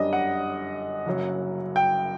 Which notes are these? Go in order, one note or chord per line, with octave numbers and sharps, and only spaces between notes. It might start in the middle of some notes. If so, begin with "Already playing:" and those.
Already playing: G1 F#2 D3 G3 D4 D#5
F#5
F#1 F#2 F#3
G5